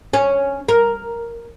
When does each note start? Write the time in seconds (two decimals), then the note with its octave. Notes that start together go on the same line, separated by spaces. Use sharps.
0.13 C#4
0.69 A#4